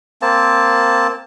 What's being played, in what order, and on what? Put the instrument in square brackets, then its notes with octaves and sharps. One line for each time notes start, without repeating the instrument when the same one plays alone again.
[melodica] A#3 C4 A5